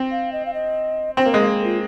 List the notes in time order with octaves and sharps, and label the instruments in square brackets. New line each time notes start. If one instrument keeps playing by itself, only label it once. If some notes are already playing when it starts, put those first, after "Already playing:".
Already playing: [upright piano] C4
[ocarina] F5
D#5
F5
D#5
[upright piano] C4 [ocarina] C5
[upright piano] A#3
[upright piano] G#3 [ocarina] D#5
[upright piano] A#3
[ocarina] A#4
F4